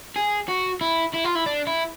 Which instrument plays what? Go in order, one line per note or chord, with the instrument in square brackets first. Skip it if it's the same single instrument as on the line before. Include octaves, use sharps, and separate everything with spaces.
[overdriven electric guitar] G#4
F#4
E4
E4
F4
E4
D4
E4